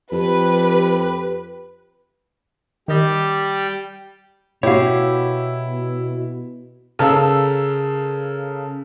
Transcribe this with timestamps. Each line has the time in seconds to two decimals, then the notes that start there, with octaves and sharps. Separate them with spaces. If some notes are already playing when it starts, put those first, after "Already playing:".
0.12 F2 G4 B4
2.88 D#3 G3 G4 D#5
4.63 B2 E4 F#4 G4 C#5 F5
6.99 C#3 A4 A#4 F5 E6